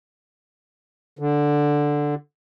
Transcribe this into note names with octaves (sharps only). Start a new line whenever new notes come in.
D3